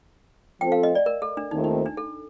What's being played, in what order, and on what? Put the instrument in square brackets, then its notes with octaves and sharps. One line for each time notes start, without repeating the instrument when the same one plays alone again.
[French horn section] F3 C4 F4 A4 C5 [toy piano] G5
[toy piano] F5
D#5
D5
A#4
A4
D4
[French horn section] D#2 D#3 A3 C4 F4 [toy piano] D#4
[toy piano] D#4
D4
A4